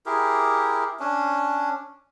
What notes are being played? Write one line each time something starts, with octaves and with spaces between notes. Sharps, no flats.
E4 G4 G#4 A#4
C#4 D4